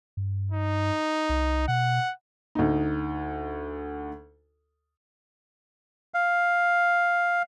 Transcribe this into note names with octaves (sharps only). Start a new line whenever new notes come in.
G2
D#4
C2
B2 F#5
D2 D#4
F5